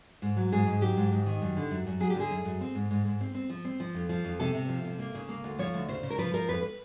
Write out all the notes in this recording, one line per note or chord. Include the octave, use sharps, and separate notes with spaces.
G#2
F#3
G#2 G#4
G#2
F#3 G4
G#2
G#2
D#3
F#2
D3
F#2
F#2
F#3 G#4
G4
D3 G#4
F#2
F#2
C4
G#2
G#2
G#2
C4
C4
F3
C4
F3
F2
F3
F2
C3 A4
C3
F3
C3
A#3
C#3
A#3
D2
F3 C#5
D2
C#3 C5
C#3
A#4
F3 B4
F3 A#4
F2 B4
B4